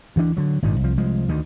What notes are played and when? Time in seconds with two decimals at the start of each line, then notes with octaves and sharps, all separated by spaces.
0.16 D2 E3 G#3 D4
0.37 D3 F#3
0.62 G#1 G2 A#2 D#3
0.81 C2 F3
0.98 C2 F3 G#3
1.29 D2 D#3